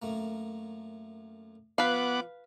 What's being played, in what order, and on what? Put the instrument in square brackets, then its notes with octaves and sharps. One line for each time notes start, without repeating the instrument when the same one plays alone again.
[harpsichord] F#2 A3 A#3
[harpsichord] F3 [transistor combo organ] B3 F#5 D6 [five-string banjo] B4 F5